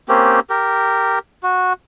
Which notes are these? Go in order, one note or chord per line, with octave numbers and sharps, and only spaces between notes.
A#3 C4 C#4 G4
G4 A#4
F#4